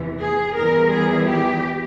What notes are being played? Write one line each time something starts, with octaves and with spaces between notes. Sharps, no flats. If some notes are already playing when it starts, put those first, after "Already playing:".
Already playing: E2 C3 E3
G#4
E2 E3 G3 A#4
G#4
G4